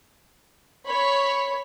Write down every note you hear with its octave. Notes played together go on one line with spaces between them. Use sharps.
C#5 B5